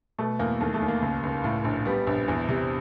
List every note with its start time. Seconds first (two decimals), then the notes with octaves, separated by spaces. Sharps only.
0.18 B2 A3
0.39 E2 A#3
0.61 D#2 A3
0.74 A3
0.82 D#2
0.88 A#3
1.02 C#2
1.23 C#2
1.44 A2
1.64 A#1
1.85 G3 B3
2.07 A#1
2.28 E2
2.48 C3